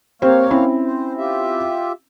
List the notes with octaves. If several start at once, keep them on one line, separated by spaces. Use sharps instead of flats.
A#3 C4 G4 C5 C#5 F5
C4 C#4 E4
C5
F4 G4 E5